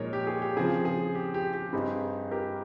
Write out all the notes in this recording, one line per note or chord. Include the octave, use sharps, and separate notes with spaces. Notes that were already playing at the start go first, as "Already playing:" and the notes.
Already playing: A#2 F3 G#3 D#4 A#4 C#5
G4
G#4
G4
C#3 F3 C4 G#4
G#4
G4
G4
G4
G2 G3 C4 D#4 G#4
G4 A#4